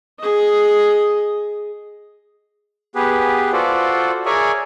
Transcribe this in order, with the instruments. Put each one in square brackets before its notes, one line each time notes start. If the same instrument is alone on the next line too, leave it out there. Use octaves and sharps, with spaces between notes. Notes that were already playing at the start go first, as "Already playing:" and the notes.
[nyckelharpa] G#4 D#5
[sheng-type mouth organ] B3 G4 G#4 B4
F4 F#4 A4 C5 D5
G#4 A#4 C#5 D5 E5 G#5